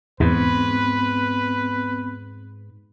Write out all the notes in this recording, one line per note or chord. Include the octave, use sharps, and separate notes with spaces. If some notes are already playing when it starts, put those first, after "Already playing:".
E2 G#2 B3 C4 B4